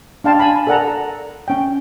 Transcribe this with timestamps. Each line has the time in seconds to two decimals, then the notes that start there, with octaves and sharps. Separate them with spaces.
0.24 D4 D5 F5 G5 A5 C6
0.40 G#5 A5 B5
0.67 A4 A#4 D5 F#5 A5 A#5
1.48 C#4 G5